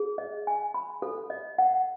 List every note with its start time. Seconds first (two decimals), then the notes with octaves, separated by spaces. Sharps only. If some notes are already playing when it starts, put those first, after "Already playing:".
Already playing: G#4
0.18 D#5
0.47 G#5
0.74 B5
1.02 A4
1.30 D#5
1.58 F#5